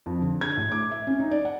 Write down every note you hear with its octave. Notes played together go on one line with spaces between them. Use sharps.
F2
D3
G#6
A2
D6
E5
C#4
D#4
D5
F#5